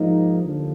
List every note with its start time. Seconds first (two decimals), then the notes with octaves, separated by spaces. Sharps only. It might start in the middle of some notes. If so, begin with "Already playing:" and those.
Already playing: G#2 F3 A#3 D#4
0.41 D#2 D3 F3